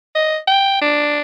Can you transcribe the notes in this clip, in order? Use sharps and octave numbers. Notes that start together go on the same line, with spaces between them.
D#5
G5
D4